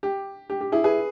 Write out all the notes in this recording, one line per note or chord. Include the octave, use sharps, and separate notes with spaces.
G4
G4
G4
E4 G#4
G#4 B4